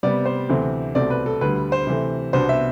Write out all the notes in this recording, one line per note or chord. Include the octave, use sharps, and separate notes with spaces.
C3 G3 B3 D5
C5
D2 C3 E3 A3 C4
C2 B2 A3 C4 D5
B4
A4
D2 D3 G3 B4
C5
C3 E3 A3
C2 B2 B3 D4 C5
E5